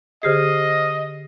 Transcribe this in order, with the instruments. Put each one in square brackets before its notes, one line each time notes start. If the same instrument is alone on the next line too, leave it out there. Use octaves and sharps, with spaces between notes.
[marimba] D3 G4 G#4 [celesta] C5 F6 C7 [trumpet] D#5